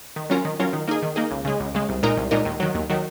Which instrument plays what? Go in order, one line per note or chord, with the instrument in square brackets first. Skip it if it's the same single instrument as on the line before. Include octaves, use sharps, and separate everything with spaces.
[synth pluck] D#3
F#3 C#4 F4 A#4
D#3
F#3 C#4 F4 A#4
D#3
A#3 D#4 G#4
D#3
A#3 D#4 G#4
C#2
C#3 G#3
C#2
C#3 G#3
C2
A#2 G#3 D#4 A#4
C2
A#2 G#3 D#4 A#4
D#2
D#3 F#3
D#2
D#3 F#3